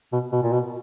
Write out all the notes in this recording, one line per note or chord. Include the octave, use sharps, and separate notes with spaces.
B2
B2
A#2
B2